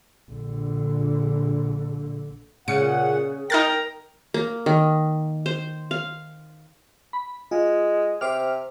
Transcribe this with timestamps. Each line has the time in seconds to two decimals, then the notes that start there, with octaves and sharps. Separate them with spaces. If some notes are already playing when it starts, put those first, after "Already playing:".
0.31 A#1 D3
2.68 A#2 C#3 F#5 C#7
3.50 D#4 A#4 G5 A#5 F6 A6
4.34 A#3
4.66 D#3
5.46 C5
5.91 F5
7.13 B5
7.51 G#3 F4
8.21 C3 C5 D6 F6